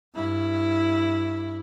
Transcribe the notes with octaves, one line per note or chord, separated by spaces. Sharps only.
G2 E4